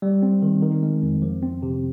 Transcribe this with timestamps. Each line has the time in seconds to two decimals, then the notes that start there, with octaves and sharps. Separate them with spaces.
0.02 G3
0.23 C4
0.42 D#3
0.62 D#3
0.83 G#3
1.02 F2
1.22 F3
1.43 C4
1.62 C3